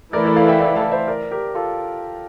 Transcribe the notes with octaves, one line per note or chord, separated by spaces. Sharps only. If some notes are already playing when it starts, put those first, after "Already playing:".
E3 A3 E4 A4 A#4 D5
A#4 D5
D5 F5
E5 G5
D5 F5
F5 A5
C5 E5
A#4 D5
G4 A#4
F4 A4